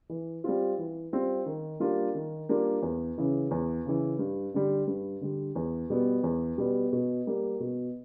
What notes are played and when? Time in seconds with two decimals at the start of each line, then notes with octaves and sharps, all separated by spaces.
0.09 E3
0.44 G3 C4 F4
0.78 E3
1.13 G3 C4 F4
1.46 D#3
1.80 G3 A#3 D4 F4
2.15 D#3
2.49 G3 A#3 D4 F4
2.82 E2
3.18 C#3 E3
3.51 E2
3.85 C#3 E3
4.19 G2
4.54 D3 G3
4.87 G2
5.21 D3 G3
5.55 E2
5.90 B2 G3 B3
6.24 E2
6.58 B2 G3 B3
6.92 B2
7.27 G3 A#3
7.60 B2